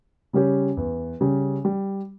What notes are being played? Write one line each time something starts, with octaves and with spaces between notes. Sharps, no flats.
C#3 G3 C#4 G4
E2
C#3 G3 C#4 G4
G3